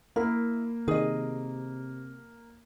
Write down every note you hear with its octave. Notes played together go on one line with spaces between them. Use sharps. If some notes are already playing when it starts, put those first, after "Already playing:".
A#3 E4 A#4
C3 D#3 G#4 D#5